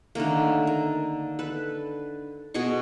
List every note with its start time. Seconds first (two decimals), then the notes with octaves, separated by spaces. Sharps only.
0.15 D3 D#3 A3 A#3
0.67 A#4
1.39 A4 B4
2.54 B2 G#4 D#5 C#6